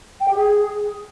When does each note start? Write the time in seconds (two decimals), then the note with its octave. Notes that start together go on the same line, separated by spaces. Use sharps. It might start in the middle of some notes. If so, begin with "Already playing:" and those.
0.20 G5
0.28 G4
0.37 G#4